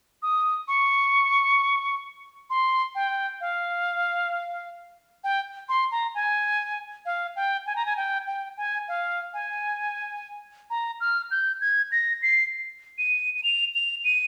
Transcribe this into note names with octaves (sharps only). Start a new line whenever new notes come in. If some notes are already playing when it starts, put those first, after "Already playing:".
D#6
C#6
C6
G5
F5
G5
C6
A#5
G#5
F5
G5
G#5
A#5
G#5
G5
G5
G#5
F5
G#5
A#5
F6
G6
G#6
A#6
C7
D#7
D#7
F7
F7
D#7